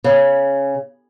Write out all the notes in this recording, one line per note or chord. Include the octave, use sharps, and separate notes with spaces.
C#3